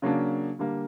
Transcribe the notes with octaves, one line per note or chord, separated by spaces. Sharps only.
C#3 F#3 A#3 D4
D3 G3 A#3